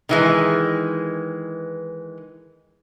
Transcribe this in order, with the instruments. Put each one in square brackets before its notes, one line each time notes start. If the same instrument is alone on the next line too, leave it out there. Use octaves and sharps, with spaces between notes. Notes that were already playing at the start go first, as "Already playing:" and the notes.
[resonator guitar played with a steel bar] D#3 E3 G#3